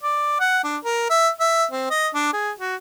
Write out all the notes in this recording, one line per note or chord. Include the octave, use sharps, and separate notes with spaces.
D5
F#5
D4
A#4
E5
E5
C4
D#5
D4
G#4
F#4